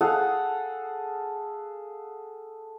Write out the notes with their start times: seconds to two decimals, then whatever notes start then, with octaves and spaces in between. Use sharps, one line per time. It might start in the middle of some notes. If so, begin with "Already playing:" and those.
0.01 G#4 A4 F5 F#5